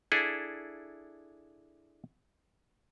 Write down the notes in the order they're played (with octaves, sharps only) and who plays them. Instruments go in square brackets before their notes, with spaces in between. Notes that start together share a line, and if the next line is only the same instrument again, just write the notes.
[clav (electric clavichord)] D4 E4 G#4 A4